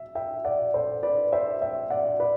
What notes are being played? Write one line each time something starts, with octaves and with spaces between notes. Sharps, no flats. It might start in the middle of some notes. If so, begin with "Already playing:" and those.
Already playing: E5
E5 G5
D5 F#5
A4 C5
B4 D5
C5 E5
E5 G5
D5 F#5
B4 D5